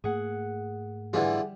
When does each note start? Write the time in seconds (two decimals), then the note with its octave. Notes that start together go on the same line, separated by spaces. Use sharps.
0.04 G#2 A3 A#3 G#4 F#5
1.13 D3 E3 G3 F4 G#4 F#5